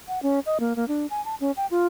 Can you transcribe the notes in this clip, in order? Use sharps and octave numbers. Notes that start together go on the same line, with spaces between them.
F#5
C#4
D#5
A#3
A#3
D4
G#5
A5
C#4
G5
F4